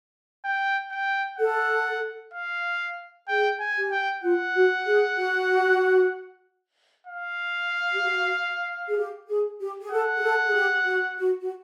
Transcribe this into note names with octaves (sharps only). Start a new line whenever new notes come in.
G5
G5
A4 F#5
F5
G#4 G5
G#5
G4
G5
F4 F#5
F#4
G#4
F#4
F5
G4
F#4
G#4
G4
G#4
G4
G#4
A4 F#5
G#4
A4
G#4
G4
F#4
F#4
F#4